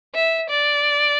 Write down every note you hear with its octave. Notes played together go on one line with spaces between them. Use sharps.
E5
D5